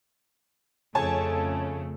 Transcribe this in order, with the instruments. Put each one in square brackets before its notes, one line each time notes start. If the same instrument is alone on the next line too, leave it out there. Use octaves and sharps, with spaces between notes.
[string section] F2 C#3 A3 [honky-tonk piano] C#5 G#5 A5